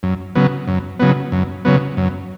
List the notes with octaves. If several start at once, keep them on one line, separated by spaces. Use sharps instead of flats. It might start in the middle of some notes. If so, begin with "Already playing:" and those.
F#2
C#3 F#3 B3
F#2
C#3 F#3 B3
F#2
C#3 F#3 B3
F#2